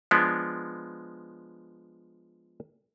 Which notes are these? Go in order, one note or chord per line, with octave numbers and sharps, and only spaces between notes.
F3 G#3 B3 D4